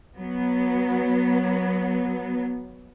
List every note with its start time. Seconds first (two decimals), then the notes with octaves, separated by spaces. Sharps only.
0.16 F#3 B3